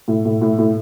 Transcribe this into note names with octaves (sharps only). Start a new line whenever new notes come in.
A2
A2
A2
A2